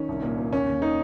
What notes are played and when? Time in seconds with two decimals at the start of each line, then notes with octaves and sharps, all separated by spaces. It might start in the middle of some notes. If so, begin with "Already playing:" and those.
Already playing: D#3 C#4
0.08 C2
0.22 A#2
0.38 A#2
0.52 D#2 C#4
0.67 D#2
0.82 D#3 D#4